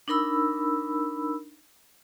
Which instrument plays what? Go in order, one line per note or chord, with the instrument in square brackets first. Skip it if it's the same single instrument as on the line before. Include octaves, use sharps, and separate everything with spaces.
[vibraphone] D4 D#4 A#4 B5 E6